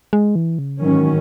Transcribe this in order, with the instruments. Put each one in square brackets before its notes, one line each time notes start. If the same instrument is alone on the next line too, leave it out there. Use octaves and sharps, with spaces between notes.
[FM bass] G#3
E3
C#3
[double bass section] G#2 D#3 F#3 C#4 [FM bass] E3